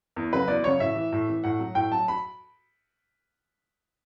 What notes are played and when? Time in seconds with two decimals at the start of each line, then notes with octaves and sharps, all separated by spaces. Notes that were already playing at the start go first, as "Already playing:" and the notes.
0.16 E2
0.33 C#3 F#3 B4
0.48 E2 D5
0.64 C#3 F#3 C#5
0.80 A2 E5
0.95 E3
1.13 A2
1.29 E3
1.44 A2 F#5
1.59 F#3
1.75 A2 G5
1.92 F#3 A5
2.08 B5